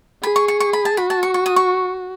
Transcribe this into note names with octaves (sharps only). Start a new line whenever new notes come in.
G#4 B5
C#6
C#6
C#6
B5
A5
F#4 B5
A5
C#6
C#6
D#6
C#6